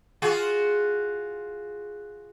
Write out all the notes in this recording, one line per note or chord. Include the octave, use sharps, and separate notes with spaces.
F4 F#4 G#4